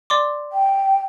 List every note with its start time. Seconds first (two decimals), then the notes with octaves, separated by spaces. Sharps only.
0.10 D5 C6 D6
0.52 G5